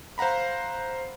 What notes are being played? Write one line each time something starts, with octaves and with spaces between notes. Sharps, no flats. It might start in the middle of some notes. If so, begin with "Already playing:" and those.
C5 F5 F#5 A#5 B5